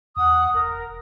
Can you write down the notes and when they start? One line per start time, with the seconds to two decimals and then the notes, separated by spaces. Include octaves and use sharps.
0.17 E2 F#5 D#6
0.54 F1 A#4
0.71 E1